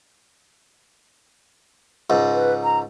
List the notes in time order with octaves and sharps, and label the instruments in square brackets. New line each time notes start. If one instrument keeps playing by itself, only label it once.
[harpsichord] C#2 G#2
[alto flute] B4
A#5